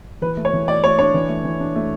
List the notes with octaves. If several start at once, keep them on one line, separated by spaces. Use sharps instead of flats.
E3 B4
A3
C#5
E3
A3 D5
A3 C#5
D4 C#5
E3
A3
E3
D4
A3